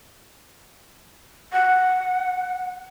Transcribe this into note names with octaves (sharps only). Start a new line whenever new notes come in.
F#5